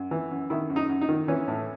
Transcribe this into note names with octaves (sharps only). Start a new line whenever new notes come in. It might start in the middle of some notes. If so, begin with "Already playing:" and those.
Already playing: F#2
E3
F#2
D#3 E4
F#2
D#4
F#2
D#4
D#3
E3 C#4
A2